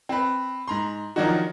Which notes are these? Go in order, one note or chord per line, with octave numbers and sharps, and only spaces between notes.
C4 B4
G#2 A#5 C6
D#3 F3 F#3 D4 D#4 F#4